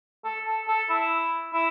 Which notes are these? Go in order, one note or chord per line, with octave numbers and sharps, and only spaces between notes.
A4
A4
A4
E4
E4